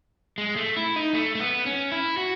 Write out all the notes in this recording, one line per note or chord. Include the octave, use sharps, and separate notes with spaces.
G#3
A3
E4
D#4
A3
A3
B3
C#4
E4
F#4